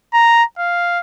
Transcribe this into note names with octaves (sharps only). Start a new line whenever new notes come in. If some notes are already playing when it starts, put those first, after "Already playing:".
A#5
F5